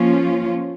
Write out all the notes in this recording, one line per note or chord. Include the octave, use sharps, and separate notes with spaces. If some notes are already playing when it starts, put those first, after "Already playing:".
Already playing: F3 A#3 C#4 F4